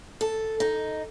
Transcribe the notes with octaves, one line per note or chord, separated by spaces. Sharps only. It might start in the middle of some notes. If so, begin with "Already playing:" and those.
A4
D#4